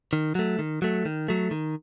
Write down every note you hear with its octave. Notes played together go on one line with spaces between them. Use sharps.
D#3
F#3 A3
D#3
F#3 A3
D#3
F#3 A3
D#3